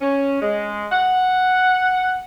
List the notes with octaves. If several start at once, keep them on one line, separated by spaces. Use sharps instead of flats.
C#4
G#3
F#5